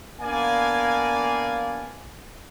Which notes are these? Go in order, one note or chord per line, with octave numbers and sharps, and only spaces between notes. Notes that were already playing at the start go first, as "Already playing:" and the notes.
A#3 B3 D4 D5 F5 G#5